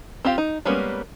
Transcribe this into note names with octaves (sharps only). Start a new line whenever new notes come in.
C4 F4 G4 F5
D#4
G3 G#3 A#3 B3 C#4